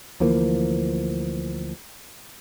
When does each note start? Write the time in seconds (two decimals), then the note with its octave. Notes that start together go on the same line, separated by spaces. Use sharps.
0.20 D2 E3 F3 A#3